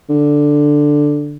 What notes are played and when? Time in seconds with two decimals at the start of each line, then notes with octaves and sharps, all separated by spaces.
0.09 D3